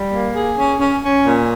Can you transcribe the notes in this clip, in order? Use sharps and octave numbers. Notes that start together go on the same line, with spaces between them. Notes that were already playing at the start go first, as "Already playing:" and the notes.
Already playing: G3
A#3
G#4
C#4
C#4
C#4
A#2